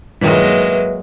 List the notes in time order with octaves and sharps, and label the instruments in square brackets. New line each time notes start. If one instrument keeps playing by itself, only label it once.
[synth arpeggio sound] G2 A#2 D#3 [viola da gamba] F#3 G#3 A#3 [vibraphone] B4 E5